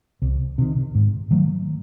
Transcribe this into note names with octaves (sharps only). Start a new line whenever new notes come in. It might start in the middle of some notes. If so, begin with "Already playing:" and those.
C2
C3 D#3
G#2
D#3 F#3 A3